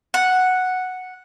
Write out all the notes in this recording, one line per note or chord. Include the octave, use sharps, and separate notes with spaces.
F#5